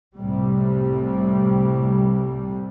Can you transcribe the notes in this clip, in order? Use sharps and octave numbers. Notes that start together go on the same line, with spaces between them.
C2 A2 C3 G3